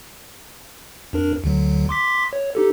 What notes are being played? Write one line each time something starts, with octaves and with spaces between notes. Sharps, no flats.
F2 D4 A#4
D2 D3 F#3
C6 D6 B6
C#5
D#4 G4 A4